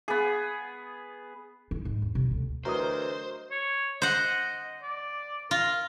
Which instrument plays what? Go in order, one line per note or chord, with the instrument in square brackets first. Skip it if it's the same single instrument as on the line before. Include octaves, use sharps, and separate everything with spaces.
[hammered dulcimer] B3 G#4
[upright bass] E4
G#2
E2
C3
D2
[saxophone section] D2 E3 [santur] F#3 D#5 E5 [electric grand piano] A#4 D#6 [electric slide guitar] C5
[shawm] C#5
[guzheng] C5 F#5 [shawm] D#5
[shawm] D5
[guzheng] F4 [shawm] A#4